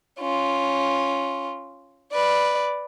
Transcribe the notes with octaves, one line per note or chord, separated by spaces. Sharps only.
C#4 F4
B4 D5